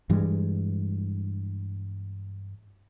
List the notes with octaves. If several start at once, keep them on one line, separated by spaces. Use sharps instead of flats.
G2 E3 G3 G#3